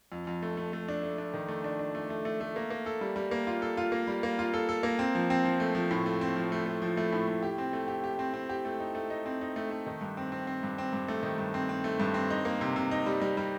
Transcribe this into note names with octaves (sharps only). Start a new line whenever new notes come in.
F2
F2
A3
A3
A3
D4
A3
D4
D#3
A3
D4
D4
A3
A3
A3
A3
A#3
A#3
A4
G3
G3
A#3
F4
A4
F4
A#3
G3
A#3
F4
A4
A4
A#3
C4
F3
C4
F3
A3
F3
A2
A3
C4
F3
A3
A3
F3
A3
A2
A2
G4
C4
A3
G4
G4
C4
C4
G4
A3
D#4
A3
D#4
C4
D#4
A3
A3
D#3
G2
C4
C4
C4
G2
C4
G2
A3
D#3
G2
C4
C4
A3
G2
C4
D#4
A#3
C3
C3
D#4
G3
G3
G3